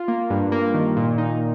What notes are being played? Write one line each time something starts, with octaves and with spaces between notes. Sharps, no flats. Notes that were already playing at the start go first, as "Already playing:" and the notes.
Already playing: F4
A#3
G2
A#3
D#3
A#2
D#4